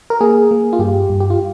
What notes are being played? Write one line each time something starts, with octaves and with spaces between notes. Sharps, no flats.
A#4
A#3 G#4
A#3
F4
G2 G4
G2
G4
F4